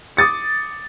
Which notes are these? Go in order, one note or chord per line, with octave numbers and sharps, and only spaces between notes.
D6 D#6 A6 C#7